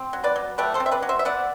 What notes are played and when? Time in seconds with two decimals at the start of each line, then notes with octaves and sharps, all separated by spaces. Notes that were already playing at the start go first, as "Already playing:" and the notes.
Already playing: C4
0.13 F#3
0.24 B4 D5
0.36 F#3
0.58 A3 G4 B4
0.74 A4 C5
0.80 C4
0.86 E5
0.92 B4 D5
1.03 F#3
1.09 C5 E5
1.19 E5
1.25 B3 D5 F#5